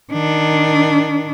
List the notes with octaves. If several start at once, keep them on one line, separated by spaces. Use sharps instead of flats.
D#3 D4